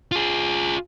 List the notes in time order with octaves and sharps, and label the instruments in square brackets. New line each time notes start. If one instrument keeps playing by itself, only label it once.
[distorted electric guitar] F4 G#4